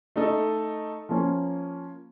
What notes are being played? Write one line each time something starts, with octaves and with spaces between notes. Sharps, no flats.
A3 D#4 A4
F3 A#3 C#4